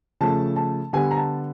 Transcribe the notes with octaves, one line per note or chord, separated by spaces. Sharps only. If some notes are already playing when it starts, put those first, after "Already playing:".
C#3 F3 A3 A5
A5
D3 G3 B3 G#5
A#5
A5